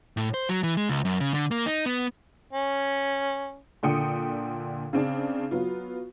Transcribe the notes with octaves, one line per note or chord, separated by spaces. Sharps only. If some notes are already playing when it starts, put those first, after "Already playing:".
A2
C5
F#3
E3
G#3
C#2
F#2
C#3
D3
A#3
D#4
B3
C#4
A#2 D3 G5 D#6 C#7
C#3 C4 D4
F#3 B3 F4